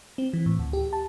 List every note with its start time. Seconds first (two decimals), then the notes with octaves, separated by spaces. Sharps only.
0.18 C4
0.33 E3
0.46 A2
0.59 D2
0.73 G4
0.93 A5